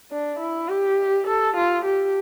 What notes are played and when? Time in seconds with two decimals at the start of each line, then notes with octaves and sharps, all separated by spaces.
0.11 D4
0.39 E4
0.69 G4
1.27 A4
1.56 F4
1.84 G4